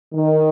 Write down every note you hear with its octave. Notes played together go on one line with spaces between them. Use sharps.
D#3